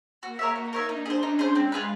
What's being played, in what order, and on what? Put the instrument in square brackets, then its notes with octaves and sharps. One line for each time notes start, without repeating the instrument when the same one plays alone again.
[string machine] A#3 [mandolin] F#4
[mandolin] A#4 C#5 E5
[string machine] D#4 [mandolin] F#4
[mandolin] A#4 C#5 E5
[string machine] D4 [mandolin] D#4
[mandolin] G#4 C5
[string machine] C#4 [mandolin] D#4
[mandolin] G#4 C5
[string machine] G#3 [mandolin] C4
[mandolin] F4 G#4 B4